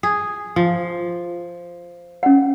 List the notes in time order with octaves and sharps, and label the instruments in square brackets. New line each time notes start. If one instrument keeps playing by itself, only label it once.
[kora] G#4
F3
[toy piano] C#4 F#5